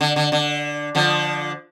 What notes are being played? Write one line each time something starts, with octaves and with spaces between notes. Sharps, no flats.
D3
D3
D3
D3 F3